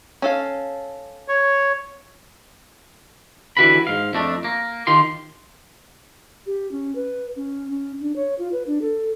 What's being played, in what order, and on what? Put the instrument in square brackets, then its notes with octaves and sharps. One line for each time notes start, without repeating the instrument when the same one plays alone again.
[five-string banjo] C#4 A4 F5
[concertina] C#5
[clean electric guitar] D3 E3 F#4 G4 B4 B5
G#2 F5
F2 A3 D4
A#3
D#3 F4 G4 C6
[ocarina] G4
C#4
B4
C#4
C#4
D4
C#5
F4
B4
D4
A4